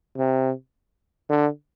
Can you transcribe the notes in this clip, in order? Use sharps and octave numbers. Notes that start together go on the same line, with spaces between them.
C3
D3